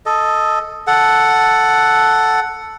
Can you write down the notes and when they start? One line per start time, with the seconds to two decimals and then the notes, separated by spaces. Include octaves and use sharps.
0.06 A4 D#5
0.87 A4 F#5